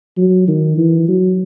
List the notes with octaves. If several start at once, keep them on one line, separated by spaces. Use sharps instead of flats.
F#3
D#3
E3
F#3